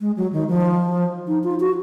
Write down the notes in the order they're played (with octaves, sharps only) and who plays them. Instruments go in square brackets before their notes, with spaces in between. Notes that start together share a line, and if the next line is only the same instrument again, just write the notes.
[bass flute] G#3
F#3
D#3
F3
D#4
F4
F#4